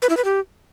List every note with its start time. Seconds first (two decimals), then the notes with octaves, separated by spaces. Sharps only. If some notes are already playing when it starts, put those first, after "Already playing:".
0.02 B4
0.10 E4
0.17 B4
0.25 G4